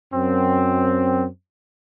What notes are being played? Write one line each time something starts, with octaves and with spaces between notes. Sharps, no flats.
F#2 C4